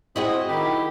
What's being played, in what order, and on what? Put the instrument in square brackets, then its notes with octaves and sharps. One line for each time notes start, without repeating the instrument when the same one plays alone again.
[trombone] C4 [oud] E4 F#4 G#4 [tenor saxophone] D#5
[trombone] D#3 [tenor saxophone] G4 [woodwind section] B5